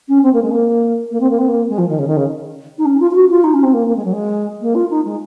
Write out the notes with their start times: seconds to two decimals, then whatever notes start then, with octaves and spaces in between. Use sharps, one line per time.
0.08 C#4
0.23 C4
0.33 A#3
0.42 G#3
0.51 A#3
1.11 A#3
1.20 C4
1.30 A#3
1.38 C4
1.48 A#3
1.69 G#3
1.78 F3
1.89 D#3
1.98 C#3
2.07 D#3
2.17 C#3
2.78 D#4
2.85 C#4
3.00 F4
3.11 F4
3.15 F#4
3.30 F4
3.44 D#4
3.54 C#4
3.63 C4
3.73 A#3
3.87 A#3
3.96 G#3
4.05 F#3
4.12 G#3
4.61 A#3
4.75 F4
4.90 D#4
5.05 G#3